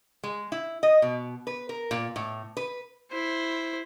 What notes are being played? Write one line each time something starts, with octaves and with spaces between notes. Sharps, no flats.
G#3
E4
D#5
B2
B4
A#4
A#2
A2
B4
E4 C5